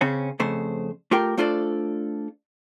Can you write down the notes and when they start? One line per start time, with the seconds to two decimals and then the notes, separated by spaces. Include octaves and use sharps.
0.01 C#3 C4 C#4
0.40 F2 C#3 A3 C5
1.11 A3 F4 G4 A#4 G5
1.37 A3 D4 F4 A4 C5 D5